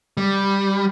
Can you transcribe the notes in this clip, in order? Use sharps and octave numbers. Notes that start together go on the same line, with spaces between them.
G3